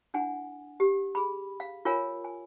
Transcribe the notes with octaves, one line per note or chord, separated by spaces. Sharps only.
D4 E4 F#5 G#5
G4
G#4 B5
F5
F4 A#4 C#5 F5 G#5
G#5